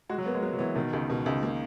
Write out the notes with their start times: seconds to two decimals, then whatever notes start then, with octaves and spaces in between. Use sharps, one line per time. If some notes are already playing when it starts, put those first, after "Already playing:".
0.09 G#3 F#4
0.18 F#3
0.26 A#3 B3
0.34 G#3
0.43 F#3 B3
0.53 F#3
0.59 E3 B3
0.75 B2 D#3
0.93 C#2
1.10 B2
1.26 C#2
1.43 A#3